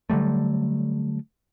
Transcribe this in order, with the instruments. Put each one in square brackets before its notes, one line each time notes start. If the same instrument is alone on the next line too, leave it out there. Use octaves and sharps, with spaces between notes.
[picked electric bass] D3 F#3 G3 A3